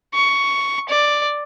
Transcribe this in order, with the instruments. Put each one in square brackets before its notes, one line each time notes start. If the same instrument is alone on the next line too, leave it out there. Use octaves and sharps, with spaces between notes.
[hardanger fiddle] C#6
D5